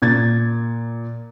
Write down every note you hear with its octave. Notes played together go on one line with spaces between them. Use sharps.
A#2 G#6 A6